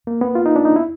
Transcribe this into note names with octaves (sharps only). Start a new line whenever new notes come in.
A#3
B3
F4
D#4
D4
D#4
E4